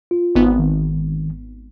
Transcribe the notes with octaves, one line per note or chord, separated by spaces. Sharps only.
F4
G#1 B3
D#3